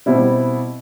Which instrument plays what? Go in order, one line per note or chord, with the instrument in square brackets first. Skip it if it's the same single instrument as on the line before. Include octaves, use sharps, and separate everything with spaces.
[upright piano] B2 G3 C4 E4